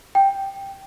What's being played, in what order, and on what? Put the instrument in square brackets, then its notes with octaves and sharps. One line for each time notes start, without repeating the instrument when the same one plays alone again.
[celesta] G5